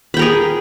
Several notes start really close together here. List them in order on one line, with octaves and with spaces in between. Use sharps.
B5 G5 A#4 G#4